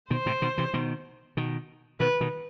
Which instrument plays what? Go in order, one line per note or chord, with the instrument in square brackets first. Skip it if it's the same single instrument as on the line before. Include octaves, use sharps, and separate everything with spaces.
[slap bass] B2 D#3 [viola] C5
[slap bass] A2 C3
B2 D#3
C3 E3
B2 D#3
B2 D#3
[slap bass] B2 D#3 [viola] B4
[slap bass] B2 D#3